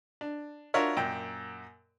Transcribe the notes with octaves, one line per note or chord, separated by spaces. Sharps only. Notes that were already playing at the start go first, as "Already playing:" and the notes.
D4
D4 F4 F#4 A#4 C#5 E5
F#2 A#2 G5